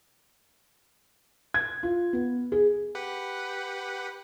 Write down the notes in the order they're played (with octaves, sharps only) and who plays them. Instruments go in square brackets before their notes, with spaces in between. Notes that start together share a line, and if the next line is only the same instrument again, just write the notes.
[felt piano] G#6
F4
B3
G#4
[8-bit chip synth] G4 B4 F#5